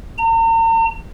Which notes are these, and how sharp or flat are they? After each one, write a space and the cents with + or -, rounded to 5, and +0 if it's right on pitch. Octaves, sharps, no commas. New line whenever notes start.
A#5 -45